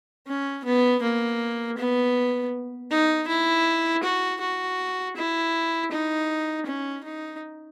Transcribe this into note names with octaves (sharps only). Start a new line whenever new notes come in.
C#4
B3
A#3
B3
D#4
E4
F#4
F#4
E4
D#4
C#4
D#4